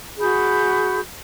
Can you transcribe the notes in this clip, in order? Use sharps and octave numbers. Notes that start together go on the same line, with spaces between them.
F#4 G#4 B5 G6